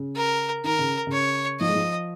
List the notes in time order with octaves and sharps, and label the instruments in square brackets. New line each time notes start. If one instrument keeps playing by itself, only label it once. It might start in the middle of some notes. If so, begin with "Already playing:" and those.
Already playing: [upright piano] C#3
[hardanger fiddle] A#4
[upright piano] D#3 [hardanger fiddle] A#4
[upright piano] C#3
C#3
[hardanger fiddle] C#5
[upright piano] F3 [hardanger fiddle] D#5
[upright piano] G#3
F3